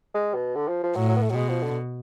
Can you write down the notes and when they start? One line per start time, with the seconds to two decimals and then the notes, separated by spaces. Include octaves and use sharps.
0.14 G#3
0.34 B2
0.55 D3
0.68 F3
0.83 F3
0.96 A2 F#3
1.09 F#3
1.16 B3
1.22 A3
1.30 F#3
1.35 B2 G#3
1.49 F3
1.63 D3